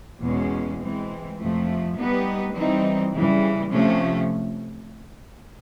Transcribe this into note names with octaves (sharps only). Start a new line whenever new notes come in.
E2 B2 G#3 C#4
E3 G#3 C4
F2 C3 F3 A3
G3 B3 D#4 G4 B4
E3 G3 C4 D#4
C#3 E3 G3
C3 F3 A3 C#4